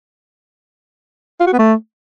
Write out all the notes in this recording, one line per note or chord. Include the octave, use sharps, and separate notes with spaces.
F4
F#4
B3
A3